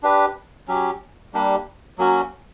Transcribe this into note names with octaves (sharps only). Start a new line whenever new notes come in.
D4 G4 B4
F#3 C#4 G4
G3 A#3 D4 G4
F#3 A#3 C#4 F#4